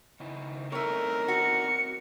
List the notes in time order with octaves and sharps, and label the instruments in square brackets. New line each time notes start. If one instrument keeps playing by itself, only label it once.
[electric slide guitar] C#3 D#4 E4
[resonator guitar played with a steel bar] A3 C#5 [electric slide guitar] C4 D#4 E4 [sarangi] A#4
[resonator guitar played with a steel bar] F#4 [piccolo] C#7